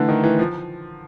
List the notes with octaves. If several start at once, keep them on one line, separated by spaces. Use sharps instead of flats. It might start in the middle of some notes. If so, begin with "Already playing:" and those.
Already playing: D3 E3 A3
D#3
E3
F3